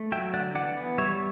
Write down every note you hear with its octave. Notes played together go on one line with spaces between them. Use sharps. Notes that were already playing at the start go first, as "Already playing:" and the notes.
Already playing: A3
F#3 E5 G5
D3 D5 F#5
E3 D5 F#5
B3
G3 C#5 E5